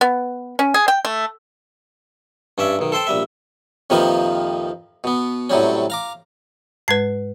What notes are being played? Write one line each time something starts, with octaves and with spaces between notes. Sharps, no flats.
B3
C#4
G#4
G5
A3
G2 C#4 D5 E5
B1 D#3
A4 C5 G5 A5
A#1 G3 E5
F2 C3 D#3 F3 A#3 B4
B2 B3
A2 C3 F#3 G3 C#4
F5 A#5 D6
G#2 G#3 B4 G#6 C7